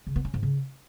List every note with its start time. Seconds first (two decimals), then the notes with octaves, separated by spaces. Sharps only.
0.07 C#3
0.16 B3
0.25 C#4
0.34 G#2
0.43 C#3